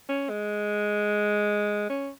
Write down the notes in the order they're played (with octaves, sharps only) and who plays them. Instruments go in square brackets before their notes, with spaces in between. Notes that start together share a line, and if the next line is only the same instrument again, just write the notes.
[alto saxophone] C#4
G#3
C#4